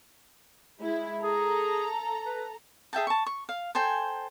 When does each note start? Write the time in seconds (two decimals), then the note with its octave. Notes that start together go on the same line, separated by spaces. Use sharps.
0.80 G#3 E4
1.23 G#4 A4 A#5
2.26 B4
2.93 G#4 E5 G5 A5
3.07 A5 C#6
3.26 C#6
3.49 F5
3.75 A4 C5 G5 G#5